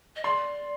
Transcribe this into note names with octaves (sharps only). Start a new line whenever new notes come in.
D#5
D5 C6